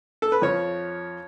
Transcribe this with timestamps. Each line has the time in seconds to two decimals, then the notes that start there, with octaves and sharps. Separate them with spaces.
0.22 A4
0.32 B4
0.42 F2 F3 C#5